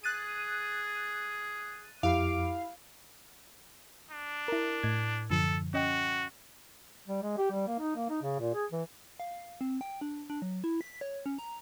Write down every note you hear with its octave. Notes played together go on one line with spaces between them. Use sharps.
G#4 F#6 A6 D#7
F2 E4 G4 F5 B5 D6
D4
E4 A#4
A2 G#6
F#2 D3 F3 A4
C#4 F#4 D#5 G5
G3
G#3
G4
G3
A#3
D#4
A#3
D#4
C#3
A#2
G#4
E3
F5
C4
G5
D4
D4
F#3
E4
B6
C#5
C#4
A#5